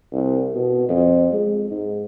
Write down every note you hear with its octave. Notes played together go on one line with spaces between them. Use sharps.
C2
B2
F2
G#3
G#2